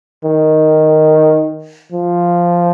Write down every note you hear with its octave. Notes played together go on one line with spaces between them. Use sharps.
D#3
F3